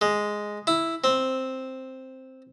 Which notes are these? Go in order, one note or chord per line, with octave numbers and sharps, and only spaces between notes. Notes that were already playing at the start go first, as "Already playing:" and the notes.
G#3
E4
C4